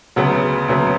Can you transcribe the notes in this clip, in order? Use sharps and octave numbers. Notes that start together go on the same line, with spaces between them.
D2 C#3 F#3 B3
D2 C#3 F#3 B3